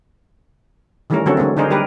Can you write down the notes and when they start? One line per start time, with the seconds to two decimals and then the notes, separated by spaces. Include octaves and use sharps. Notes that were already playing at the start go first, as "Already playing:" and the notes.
1.10 D#3 E3 G3 A3 C#4 A#4
1.26 D3 F#3 C4 C#4 F#4 A4
1.37 D3 G#3 A#3 C4
1.57 D3 D4 D#4 G#4 A#4 C5
1.70 G3 G4 A#4 B4